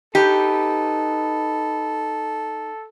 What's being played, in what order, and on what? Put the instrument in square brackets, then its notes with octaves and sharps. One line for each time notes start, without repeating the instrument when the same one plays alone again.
[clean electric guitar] D#4 B4 [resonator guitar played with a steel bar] G4 [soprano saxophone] A4